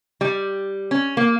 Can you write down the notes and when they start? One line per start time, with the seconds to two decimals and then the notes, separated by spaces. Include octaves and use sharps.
0.21 G3
0.91 C#4
1.17 A#3